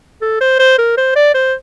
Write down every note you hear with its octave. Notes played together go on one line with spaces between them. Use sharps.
A4
C5
C5
A#4
C5
D5
C5